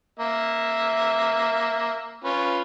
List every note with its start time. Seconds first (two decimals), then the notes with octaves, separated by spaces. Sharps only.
0.19 A#3 E5
2.24 C#4 F4 B4